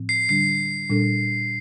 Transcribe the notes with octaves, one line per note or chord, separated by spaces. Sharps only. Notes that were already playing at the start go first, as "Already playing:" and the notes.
Already playing: A2 F3 C4
C7
D3 G3 D4 C7
A#2 G3 D4 A4